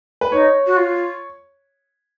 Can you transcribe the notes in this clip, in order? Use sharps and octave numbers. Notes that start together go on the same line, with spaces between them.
B4
D#4 C#5
F#4
F4